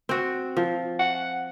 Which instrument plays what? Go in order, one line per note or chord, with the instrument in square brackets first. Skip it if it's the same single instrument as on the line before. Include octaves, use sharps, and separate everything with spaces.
[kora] C4 F#4
F3
[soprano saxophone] F#5